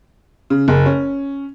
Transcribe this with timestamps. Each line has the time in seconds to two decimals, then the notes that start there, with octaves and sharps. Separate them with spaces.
0.50 C#3
0.68 F#1
0.86 C#4